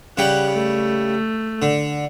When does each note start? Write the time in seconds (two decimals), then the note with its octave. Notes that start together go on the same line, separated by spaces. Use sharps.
0.18 C#3 G3 F#5 G5
0.52 A3
1.62 D3